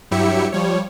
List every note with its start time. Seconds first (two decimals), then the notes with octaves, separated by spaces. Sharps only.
0.11 G2 F#3 E4 G4 E5 C#7
0.52 F3 G3 C#5